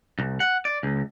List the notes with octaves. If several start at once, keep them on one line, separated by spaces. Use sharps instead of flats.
C2
F#5
D5
C#2